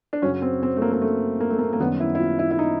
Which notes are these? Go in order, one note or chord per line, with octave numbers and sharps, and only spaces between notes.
D4
F#2 C#3 F#3 C#4
C4
C4
A3
A#3
A#3
A3
A#3
A3
A#3
A#3
F#2 D#3 G3 B3
E4
E4
F4
E4
E4
D#4